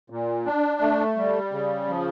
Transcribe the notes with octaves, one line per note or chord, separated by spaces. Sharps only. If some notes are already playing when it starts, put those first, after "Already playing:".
A#2
D4
A3
G3
C#3
F3